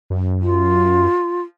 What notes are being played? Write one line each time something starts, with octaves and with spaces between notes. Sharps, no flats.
F#2
F4